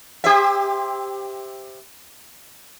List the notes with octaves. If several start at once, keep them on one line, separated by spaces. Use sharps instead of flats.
G4 C5 E5